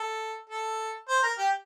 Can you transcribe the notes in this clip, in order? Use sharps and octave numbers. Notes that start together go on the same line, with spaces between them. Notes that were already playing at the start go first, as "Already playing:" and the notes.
Already playing: A4
A4
C5
A#4
G4